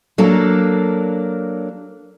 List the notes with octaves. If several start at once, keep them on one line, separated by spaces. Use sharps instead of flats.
F#3 A#3 D4 A4